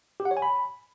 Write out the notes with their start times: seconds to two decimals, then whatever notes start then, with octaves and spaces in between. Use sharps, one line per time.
0.20 G4
0.25 F#5
0.31 C#5
0.37 G#5
0.42 B5